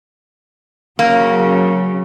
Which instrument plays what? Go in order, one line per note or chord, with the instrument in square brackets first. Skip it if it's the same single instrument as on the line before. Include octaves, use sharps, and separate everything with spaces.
[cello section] C#3 F#3 [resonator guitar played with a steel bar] A#3